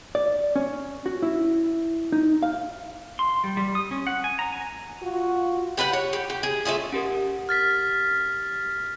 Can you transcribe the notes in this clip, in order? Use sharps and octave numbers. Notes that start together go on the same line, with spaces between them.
D5
C#4
F#4
E4
D#4
F5
C6
G3
G3
D#6
C#4
F#5
G#5
A#5
G#5
F4 F#4
G4 B4 F5 F#5
C#5
G4
G4
G#4
A3 C#4 F4 G#4
C#4 G4 A#4
F6 A6 B6